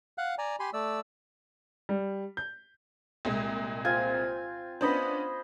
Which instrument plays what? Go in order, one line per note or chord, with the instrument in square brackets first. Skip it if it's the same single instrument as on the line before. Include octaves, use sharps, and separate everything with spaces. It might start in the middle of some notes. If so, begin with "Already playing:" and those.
[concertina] F5 F#5 F#6
D5 G#5 A#5
G4 G#5 B5 C6
A3 D5 E6
[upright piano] G3
G6
[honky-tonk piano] C2 A#2 G#3
[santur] C4 F4 G#5
[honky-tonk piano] B3 C#4 D4 [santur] C5 D#5 B5